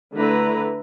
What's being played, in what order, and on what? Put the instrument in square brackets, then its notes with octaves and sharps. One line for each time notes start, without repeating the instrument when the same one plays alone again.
[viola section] D3 A3 E4 B4 A#5